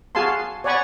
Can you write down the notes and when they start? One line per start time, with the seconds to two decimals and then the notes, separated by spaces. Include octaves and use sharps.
0.15 F#4 G#4 F5 G#5 A5 C6
0.64 C#5 D5 F#5 G#5 B5 C#6